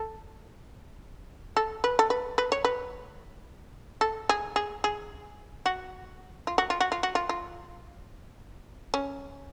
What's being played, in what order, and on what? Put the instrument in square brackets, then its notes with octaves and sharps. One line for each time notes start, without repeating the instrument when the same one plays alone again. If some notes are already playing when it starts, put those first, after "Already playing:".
Already playing: [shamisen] A4
A4
B4
A4
B4
B4
C#5
B4
A4
G#4
G#4
G#4
F#4
F4
F#4
F4
F#4
F4
F#4
F4
F4
C#4